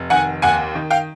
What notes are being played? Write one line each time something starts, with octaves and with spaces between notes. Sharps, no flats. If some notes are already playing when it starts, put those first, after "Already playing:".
Already playing: F1
D#3 F#5 G#5
D#2 F#5 G#5
D#3
F5 G5